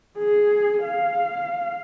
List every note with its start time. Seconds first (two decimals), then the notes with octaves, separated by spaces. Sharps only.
0.18 G#4
0.84 F5